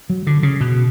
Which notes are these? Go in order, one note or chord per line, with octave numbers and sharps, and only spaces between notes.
F#3
D3
C#3
B2